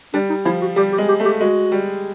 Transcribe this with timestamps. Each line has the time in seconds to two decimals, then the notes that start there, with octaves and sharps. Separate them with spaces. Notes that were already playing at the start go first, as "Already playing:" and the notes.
0.14 G3 D4
0.30 D#4
0.45 F3 E4
0.61 F#4
0.76 G3 G4
0.93 G4
0.98 G#3
1.09 G4
1.20 A3
1.25 G4
1.41 G#3 F#4
1.72 G3